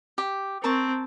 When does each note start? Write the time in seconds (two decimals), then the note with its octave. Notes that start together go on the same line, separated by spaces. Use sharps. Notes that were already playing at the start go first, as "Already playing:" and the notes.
0.18 G4
0.64 C4 A#4 A5 C#6